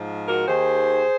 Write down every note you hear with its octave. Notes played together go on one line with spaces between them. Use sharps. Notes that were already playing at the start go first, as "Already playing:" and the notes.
Already playing: G#2 F3
F#4 A#4
D#2 D#3 G#4 C5